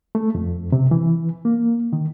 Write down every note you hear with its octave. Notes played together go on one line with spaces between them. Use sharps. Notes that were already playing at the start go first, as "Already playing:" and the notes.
A3
F2
C3
E3
A#3
D#3